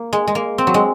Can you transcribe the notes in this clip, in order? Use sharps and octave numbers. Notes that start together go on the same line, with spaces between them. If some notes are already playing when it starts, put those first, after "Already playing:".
Already playing: A#3
G#3
G#3
A#3
C4
F#3
G#3